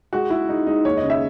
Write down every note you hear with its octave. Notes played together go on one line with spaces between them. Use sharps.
G#3 F#4
G#3 E4
G#3 D#4
G#3 D#4
D#2 C#5
D#5
C#3
E5